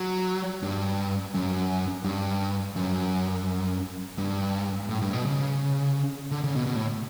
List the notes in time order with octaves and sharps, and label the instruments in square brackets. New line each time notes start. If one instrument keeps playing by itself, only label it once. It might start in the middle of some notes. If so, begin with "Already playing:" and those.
Already playing: [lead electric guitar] F#3
G2
F#2
G2
F#2
G2
A2
G2
B2
C#3
D3
C#3
B2
B2
A2